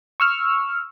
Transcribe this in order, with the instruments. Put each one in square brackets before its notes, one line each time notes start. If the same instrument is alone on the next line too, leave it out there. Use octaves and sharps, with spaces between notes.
[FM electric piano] C#6 E6 F6